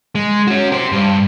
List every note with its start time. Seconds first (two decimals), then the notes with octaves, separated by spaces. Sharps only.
0.15 G#3
0.47 C#4 F#4
0.72 G4 C5
0.92 G2